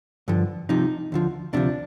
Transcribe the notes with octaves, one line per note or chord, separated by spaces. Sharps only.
G2 D3 F3
C2 C3 F3 D#4
D2 D3 F3
D2 C3 F3 D4